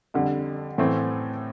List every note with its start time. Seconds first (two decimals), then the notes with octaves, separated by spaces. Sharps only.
0.14 F2 D3 G3
0.78 A2 E3 A3 C4